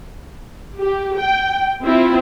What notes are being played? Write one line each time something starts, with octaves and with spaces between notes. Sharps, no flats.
G4
G5
C4 E4 F4